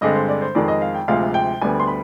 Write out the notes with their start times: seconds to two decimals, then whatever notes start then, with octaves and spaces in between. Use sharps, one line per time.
0.01 G2 D3 G#3 C4 D#5
0.15 C5
0.29 D5
0.41 C5
0.55 F2 D#3 G#3 D5
0.68 D#5
0.82 F5
0.95 G5
1.08 D2 C3 F3 G#3 F5
1.34 G5
1.61 D2 D3 G3 B3 G#5
1.80 C6
1.88 B5